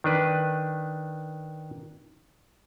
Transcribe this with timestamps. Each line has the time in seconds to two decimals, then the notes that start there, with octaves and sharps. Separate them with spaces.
0.04 D#3 D4 B4